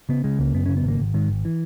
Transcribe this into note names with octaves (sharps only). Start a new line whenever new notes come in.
C#3 B3
C#3 G#3
C#2 A#3
F#2 B3
C#3 C#4
B3
G#1 A#3
G#1
G#2 D#3
G#1
E3